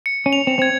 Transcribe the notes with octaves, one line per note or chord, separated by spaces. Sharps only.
C#7
C#4
F7
C4
C4 G#6